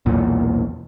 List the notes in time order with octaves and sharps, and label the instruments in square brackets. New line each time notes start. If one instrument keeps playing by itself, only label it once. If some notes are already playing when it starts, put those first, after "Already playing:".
[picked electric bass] B1 E2 A#2